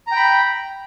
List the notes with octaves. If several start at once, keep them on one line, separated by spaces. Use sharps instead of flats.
G5 A#5 B5